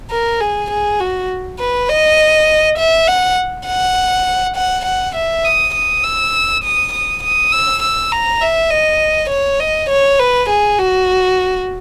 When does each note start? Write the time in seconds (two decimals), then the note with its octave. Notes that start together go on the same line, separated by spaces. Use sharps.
0.10 A#4
0.41 G#4
0.70 G#4
1.00 F#4
1.59 B4
1.89 D#5
2.78 E5
3.07 F#5
3.67 F#5
4.56 F#5
4.85 F#5
5.15 E5
5.45 D#6
5.74 D#6
6.03 E6
6.64 D#6
6.93 D#6
7.23 D#6
7.52 E6
7.82 E6
8.11 A#5
8.41 E5
8.70 D#5
9.30 C#5
9.60 D#5
9.90 C#5
10.19 B4
10.49 G#4
10.79 F#4